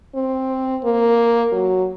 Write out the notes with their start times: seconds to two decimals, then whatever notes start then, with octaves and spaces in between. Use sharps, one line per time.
0.15 C4
0.84 A#3
1.52 F#3